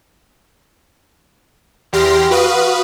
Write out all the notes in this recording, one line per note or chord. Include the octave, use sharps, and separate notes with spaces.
E2 G4 C6 F6 A#6
F#4 B4 F5 D#6